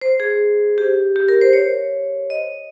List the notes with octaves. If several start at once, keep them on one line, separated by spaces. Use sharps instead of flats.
C5
G#4
G4
G4
A#4
C5
C#5
D#5